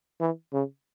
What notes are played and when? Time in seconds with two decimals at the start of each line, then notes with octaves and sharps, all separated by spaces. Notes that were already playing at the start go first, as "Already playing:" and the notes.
0.21 E3
0.53 C#3